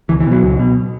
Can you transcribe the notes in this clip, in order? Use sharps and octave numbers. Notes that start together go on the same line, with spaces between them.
C#2 E3
E3
B2
F#3
C#2
B2